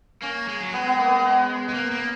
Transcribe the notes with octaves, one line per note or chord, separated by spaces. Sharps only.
A#3 C#4
G#3
F#3
G#3 B3
B3
A#3
B3
G#3
A#3
A#3